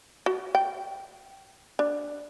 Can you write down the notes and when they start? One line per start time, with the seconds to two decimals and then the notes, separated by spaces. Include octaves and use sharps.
0.26 F#4
0.55 G5
1.79 D4